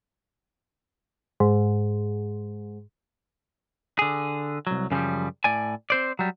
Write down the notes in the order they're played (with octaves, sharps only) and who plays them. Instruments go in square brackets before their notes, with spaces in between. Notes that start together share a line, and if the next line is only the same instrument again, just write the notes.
[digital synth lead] G#2
[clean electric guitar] D3 G#4
C2 F#3
F#2 C#3 E3 F3 G3
A2 D5 G#5
C4 C5 D5
F#3 G3